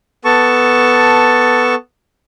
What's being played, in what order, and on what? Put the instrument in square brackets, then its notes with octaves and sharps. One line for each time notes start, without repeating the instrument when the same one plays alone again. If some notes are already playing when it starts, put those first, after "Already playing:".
[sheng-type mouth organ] B3 A4 A5 C#6